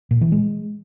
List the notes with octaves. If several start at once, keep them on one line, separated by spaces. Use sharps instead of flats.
A#2
E3
G#3